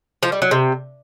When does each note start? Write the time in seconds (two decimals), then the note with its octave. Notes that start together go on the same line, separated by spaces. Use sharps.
0.23 F3
0.32 G3
0.42 F#3
0.51 C3